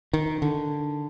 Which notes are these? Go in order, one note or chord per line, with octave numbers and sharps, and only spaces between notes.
D#3
D3